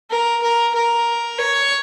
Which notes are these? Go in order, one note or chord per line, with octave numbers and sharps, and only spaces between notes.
A#4
A#4
A#4
C#5